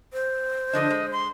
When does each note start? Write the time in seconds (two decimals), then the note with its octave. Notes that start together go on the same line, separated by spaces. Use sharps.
0.13 C5
0.73 D3 F3 D4 D#5
0.90 G#3
1.12 C6